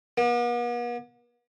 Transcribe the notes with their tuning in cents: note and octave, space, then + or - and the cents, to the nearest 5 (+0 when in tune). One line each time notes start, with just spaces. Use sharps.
B3 -45